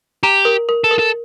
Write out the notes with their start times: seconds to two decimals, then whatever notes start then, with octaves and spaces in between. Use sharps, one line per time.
0.23 G4 A#5
0.45 A#4
0.69 A#4
0.84 A4
0.91 A#4
0.99 A4